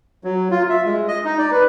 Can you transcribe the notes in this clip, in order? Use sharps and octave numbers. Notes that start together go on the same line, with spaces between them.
F#3
F4
E5
G#3
D#5
D#4
D5
B4